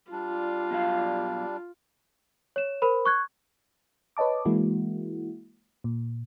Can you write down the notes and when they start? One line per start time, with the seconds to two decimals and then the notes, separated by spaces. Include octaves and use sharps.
0.12 G3 D4 F4
0.71 B2 F#3 F5
2.56 C#5 E7
2.82 A#4 C5 B5
3.05 C#6 F#6 G#6
4.17 B4 C#5 D#5 A5 D6
4.45 E3 G#3 A#3 E4 F#4
5.84 A#2